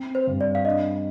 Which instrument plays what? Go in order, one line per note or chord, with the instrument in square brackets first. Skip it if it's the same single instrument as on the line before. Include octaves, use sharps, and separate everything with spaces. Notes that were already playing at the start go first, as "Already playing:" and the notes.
Already playing: [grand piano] C4
[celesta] C5
[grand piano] G2
[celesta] D5
F5
[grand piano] D4 [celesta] D#5